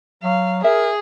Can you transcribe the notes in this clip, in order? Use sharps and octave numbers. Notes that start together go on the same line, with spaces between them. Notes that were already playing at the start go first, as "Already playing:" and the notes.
F#3 F5
G#4 A#4 E5